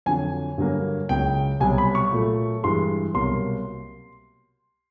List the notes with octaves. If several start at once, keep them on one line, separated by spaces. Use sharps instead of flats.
F2 D3 F#3 G#5
G2 D3 F#3 A#3
C#2 C#3 F#3 G5
C2 B2 F#3 G#5
B5
C#6
A#2 F#3 A3
G2 E3 G#3 C6
C2 B2 F#3 A#3 C6